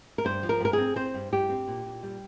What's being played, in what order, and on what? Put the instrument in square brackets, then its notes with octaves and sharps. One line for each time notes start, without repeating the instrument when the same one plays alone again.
[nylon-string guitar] A#4
G2 C5
F3
A#4
G2 A#4
C4 G#4
C4 C5
G2
G2 G4
C4
A#2
A#2
G3